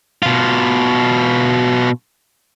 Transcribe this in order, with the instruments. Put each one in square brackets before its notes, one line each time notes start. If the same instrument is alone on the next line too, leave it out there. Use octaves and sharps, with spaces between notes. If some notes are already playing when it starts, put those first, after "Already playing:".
[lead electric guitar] B2 F4